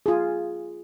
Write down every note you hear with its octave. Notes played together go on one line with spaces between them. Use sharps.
F4 G#4